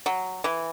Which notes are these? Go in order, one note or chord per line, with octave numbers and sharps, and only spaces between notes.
F#3
E3